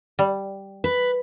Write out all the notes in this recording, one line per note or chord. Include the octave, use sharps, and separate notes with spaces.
G3
B4